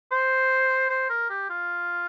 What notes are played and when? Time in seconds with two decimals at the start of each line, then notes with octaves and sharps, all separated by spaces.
0.12 C5
0.90 C5
1.10 A#4
1.30 G4
1.50 F4